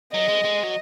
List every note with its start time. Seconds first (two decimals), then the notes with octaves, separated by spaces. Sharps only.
0.14 F#3 D#5
0.28 G#3
0.44 G#3
0.63 F#3